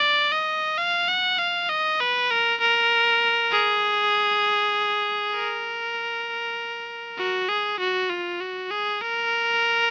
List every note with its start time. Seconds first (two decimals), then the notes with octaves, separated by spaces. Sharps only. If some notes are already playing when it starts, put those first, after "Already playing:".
Already playing: D5
0.32 D#5
0.78 F5
1.08 F#5
1.39 F5
1.69 D#5
2.00 B4
2.30 A#4
2.60 A#4
3.52 G#4
5.35 A#4
7.18 F#4
7.49 G#4
7.80 F#4
8.09 F4
8.40 F#4
8.71 G#4
9.01 A#4